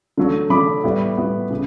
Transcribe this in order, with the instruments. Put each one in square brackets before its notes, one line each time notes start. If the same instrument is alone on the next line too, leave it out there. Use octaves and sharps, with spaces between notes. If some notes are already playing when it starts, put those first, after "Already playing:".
[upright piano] D3 F#3 A3
D3 F#3 A3 B5 D6
A2 G3 B3
A2 G3 B3
C#3